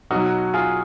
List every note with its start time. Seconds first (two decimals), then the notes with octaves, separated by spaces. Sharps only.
0.11 B2 F#3 D#4 F#4
0.53 F4 G#4